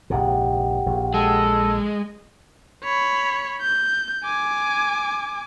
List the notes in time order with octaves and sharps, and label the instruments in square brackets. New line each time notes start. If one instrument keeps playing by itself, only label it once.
[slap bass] A#1 G#2 C3 [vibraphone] G4 F#5 G5
[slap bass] A#1
[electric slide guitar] G#3 [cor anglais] A4
[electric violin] C#5 B5
G6
G#5 D6